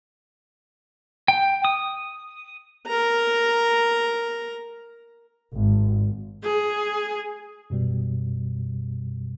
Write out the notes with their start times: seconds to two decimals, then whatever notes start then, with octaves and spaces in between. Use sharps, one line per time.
1.28 G5
1.65 D#6
2.87 A#4 A#5
5.53 G#1
6.44 G#4
7.70 F#2 B2 G3